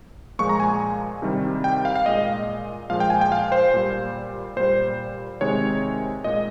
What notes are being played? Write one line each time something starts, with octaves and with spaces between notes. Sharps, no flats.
A#2 F3 G#3 C#6
A#5
G#5
C3 D#3 G3
G5
F5
F5
A#2 G#3 D#5
A#2 F3 G#3 F5
G5
G#5
G5
F5
C5
A#2 G3
A#2 G3 C5
C3 D#3 G#3 C#5
A#2 G#3 D#5